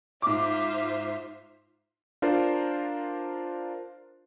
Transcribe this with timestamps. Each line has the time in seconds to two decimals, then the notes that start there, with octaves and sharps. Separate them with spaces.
0.22 G#2 F4 C5 E5 D6
2.22 D4 F4 A#4 C5